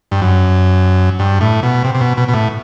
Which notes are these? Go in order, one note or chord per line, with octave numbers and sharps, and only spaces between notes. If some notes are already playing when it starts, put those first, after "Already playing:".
G2
F#2
G2
A2
B2
C3
C3
B2
B2
B2
A2